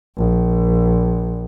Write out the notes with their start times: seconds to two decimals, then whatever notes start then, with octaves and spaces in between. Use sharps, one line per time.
0.17 A#1